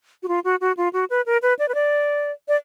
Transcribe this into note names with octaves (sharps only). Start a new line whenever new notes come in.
F#4
F4
F#4
F#4
F4
F#4
B4
A#4
B4
D5
B4
D5
D5